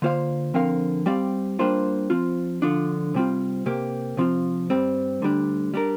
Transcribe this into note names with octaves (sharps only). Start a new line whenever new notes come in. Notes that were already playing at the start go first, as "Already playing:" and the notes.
D3 A#3 F4 C5 F5
D3 F3 C4 A#4 F5
G3 C4 G4 D5 F5
G3 A#3 D4 F4 C5
F3 C4 F4
D3 F3 D4 F4
C3 G3 C4 F4
C3 A#3 G4
C3 F3 C4 F4
G2 G3 C4
D2 D3 G3 D4
G3 D4 A#4